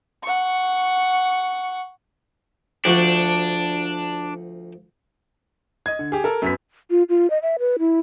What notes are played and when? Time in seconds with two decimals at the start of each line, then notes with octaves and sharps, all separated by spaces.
0.23 F#5 C#6
2.85 D2 F3 D4 F#4
5.86 D#5 G#6
5.99 D3
6.12 G4 G#4
6.24 A4 A#4
6.42 F#2 B3 B6
6.90 F4
7.09 F4
7.30 D#5
7.43 E5
7.59 B4
7.79 E4